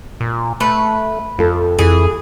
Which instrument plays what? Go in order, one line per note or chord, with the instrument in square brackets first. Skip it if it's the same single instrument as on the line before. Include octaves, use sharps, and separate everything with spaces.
[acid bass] A#2
[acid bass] A3 [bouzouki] B4
[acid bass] F2 [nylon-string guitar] F4 A4
[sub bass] F2 [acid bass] E3 [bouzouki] G#4